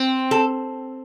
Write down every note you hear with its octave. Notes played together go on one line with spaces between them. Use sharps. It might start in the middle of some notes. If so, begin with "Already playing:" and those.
Already playing: C4
A4